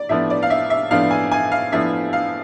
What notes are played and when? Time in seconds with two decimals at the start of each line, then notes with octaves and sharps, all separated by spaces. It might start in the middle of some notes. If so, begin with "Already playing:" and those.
Already playing: D5
0.09 A2 F3 B3 D4 E5
0.30 D5
0.43 F5
0.50 E5
0.70 E5
0.91 A2 F3 B3 D4 F5
1.11 G#5
1.32 G#5
1.52 F5
1.72 A2 F3 B3 D4 E5
2.13 F5